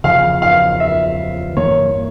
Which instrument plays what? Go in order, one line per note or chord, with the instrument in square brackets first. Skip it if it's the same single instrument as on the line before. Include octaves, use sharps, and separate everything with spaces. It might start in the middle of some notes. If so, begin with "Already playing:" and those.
[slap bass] E2 C#3 F3 [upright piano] F5
[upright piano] F5
E5
[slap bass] G2 E3 A#3 [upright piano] C#5